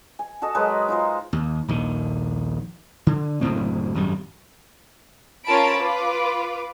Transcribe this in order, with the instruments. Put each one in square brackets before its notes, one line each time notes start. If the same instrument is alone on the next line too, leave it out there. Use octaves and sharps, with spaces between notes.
[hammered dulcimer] G#5
F#4 A4 D#5 A5
F#3 G#3 A#4 B4
D#4 F4 C5
[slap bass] D#2
A#1 D#2 D#3
D3
F#1 D2 A2 C4
G#1 F#2 G3
[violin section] C#4 F4 A#4 A5 B5 D7
F4 B4 D6